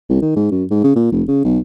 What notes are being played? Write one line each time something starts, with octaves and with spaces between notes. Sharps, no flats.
C2
D#3
G#2
F#2
G#2
C#3
A#2
F1
C#3
B1